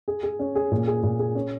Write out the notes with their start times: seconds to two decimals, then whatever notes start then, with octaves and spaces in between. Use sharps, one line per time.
0.08 G#4
0.23 G#4
0.39 C#4
0.55 G#4
0.72 A#2
0.87 G#4
1.03 A#2
1.19 G#4
1.35 C#4